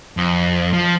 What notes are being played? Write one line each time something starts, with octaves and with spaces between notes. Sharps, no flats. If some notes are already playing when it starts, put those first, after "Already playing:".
F2
F3